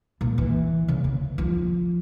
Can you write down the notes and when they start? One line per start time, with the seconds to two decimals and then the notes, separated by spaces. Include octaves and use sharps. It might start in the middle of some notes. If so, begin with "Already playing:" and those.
0.21 A#2
0.38 E3
0.88 C#3
1.04 D3
1.38 F3